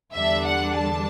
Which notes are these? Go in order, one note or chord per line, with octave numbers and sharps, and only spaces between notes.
E2 D3 G3 D4 E5
F#5
A5